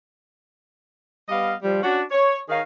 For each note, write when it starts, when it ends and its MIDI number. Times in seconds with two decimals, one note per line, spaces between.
1.29 1.53 55
1.29 1.53 59
1.29 1.53 75
1.29 1.53 77
1.63 1.81 53
1.63 1.81 55
1.83 2.00 61
1.83 2.00 62
1.83 2.00 66
2.11 2.38 73
2.49 2.60 51
2.49 2.60 63
2.49 2.60 68
2.49 2.60 73
2.49 2.60 77